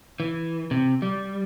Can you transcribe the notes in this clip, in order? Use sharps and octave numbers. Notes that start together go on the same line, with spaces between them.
E3
C3
G3